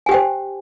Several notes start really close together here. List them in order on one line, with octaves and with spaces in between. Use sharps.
G#5 G4 G5 C5